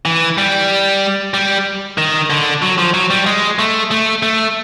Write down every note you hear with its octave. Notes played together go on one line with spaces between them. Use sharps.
E3
G3
G3
D#3
D3
F#3
F3
F#3
G3
G#3
A3
A3
A3